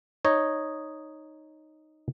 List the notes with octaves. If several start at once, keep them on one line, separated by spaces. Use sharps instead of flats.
D#4 C#5 D#5